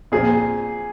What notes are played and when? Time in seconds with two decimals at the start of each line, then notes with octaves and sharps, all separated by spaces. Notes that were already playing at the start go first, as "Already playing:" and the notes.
0.12 A#2 F3 C4 F4 G#4